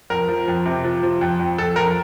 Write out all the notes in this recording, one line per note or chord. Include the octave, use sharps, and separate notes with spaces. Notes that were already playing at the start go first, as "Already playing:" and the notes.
F2 A#4
F3
F2
C3
F3
F3
F2
F2
F2 A4
F2 A#4